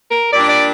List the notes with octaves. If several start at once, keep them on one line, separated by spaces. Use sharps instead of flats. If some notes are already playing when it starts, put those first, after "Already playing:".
A#4
A#2 G3 D4 D5
D5